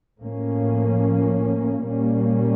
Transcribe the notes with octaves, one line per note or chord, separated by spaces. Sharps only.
A2 F3 A#3 C#4
A#2 G3 A#3 C#4